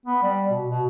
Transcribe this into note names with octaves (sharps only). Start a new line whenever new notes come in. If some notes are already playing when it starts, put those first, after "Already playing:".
B3
G3
B2
B2